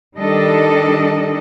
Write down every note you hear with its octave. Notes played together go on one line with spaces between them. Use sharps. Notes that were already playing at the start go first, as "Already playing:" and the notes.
D#3 G3 D4 A4 D#5